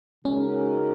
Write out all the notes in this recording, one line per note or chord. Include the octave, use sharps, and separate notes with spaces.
C#3 G#3 C#4 D#4 F#4 A#4